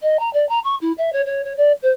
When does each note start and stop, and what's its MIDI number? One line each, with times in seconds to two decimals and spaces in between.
0.01 0.17 75
0.19 0.31 82
0.33 0.47 74
0.49 0.59 82
0.64 0.75 85
0.81 0.92 64
0.97 1.12 76
1.12 1.21 73
1.25 1.41 73
1.44 1.53 73
1.57 1.72 74
1.82 1.91 72